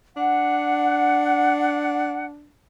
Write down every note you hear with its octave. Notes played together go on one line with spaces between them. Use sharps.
D4 F#5